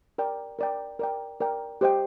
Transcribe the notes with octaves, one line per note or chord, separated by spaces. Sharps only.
A#4 D5 G5
A#4 D5 G5
A#4 D5 G5
A#4 D5 G5
G4 C5 D#5 G5